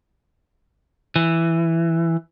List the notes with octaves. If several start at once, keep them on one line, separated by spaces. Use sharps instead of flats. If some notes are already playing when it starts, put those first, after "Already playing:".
E3